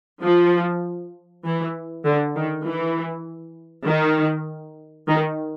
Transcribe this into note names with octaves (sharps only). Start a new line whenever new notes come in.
F3
E3
D3
D#3
E3
D#3
D#3